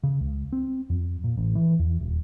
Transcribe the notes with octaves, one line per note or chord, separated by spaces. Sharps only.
C#3
C#2
C4
F2
A#2
A1
E3
E2
D#1